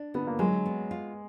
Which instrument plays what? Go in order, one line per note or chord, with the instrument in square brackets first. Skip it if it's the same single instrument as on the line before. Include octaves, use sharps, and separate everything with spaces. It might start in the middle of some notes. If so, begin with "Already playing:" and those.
Already playing: [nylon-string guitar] D4
[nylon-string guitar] D3 [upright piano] B3
[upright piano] A#3
[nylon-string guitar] F#3 [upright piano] G#3
[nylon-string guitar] B3
F4